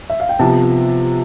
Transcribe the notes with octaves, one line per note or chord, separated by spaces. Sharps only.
E5
F5
G5
C3 F3 B3 A5